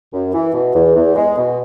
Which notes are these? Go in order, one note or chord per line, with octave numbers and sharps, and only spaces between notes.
F#2
E3
B2
E2
E2
G#3
B2